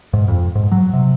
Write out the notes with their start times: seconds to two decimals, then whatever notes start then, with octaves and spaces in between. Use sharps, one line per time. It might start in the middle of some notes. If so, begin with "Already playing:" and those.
0.13 G#2
0.28 F2
0.55 G#2
0.72 F#3
0.93 C3